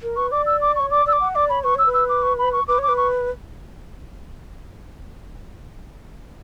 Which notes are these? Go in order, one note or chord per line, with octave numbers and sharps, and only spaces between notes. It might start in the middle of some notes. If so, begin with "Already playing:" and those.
A#4
B4 C#6
D5 D6
E6
D6
C#5 C#6
D5 D6
D5 E6
D6
F#5
D5 D6
C#5 B5
B4 C#6
C#5 E6
B4
E6
D6
C#6
B5
C#6
B4 D6
C#5 D6
B4
C#6